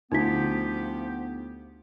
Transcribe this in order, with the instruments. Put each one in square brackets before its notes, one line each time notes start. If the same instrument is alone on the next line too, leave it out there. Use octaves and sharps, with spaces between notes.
[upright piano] D2 [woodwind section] F3 B3 G4 [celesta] D#4 E4 B6